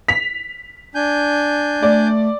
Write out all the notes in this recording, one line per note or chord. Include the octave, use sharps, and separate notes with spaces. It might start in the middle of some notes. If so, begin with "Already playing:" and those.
B6 F7
D4 G#5 G6
A3 D5